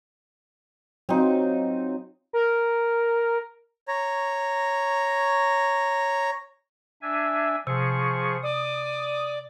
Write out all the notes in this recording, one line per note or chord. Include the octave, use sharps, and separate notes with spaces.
F#3 C4 D#4 F4
A#4
C#5 A#5
D4 E5 G#5
C3 F3 G#4 C#6
D5 D#6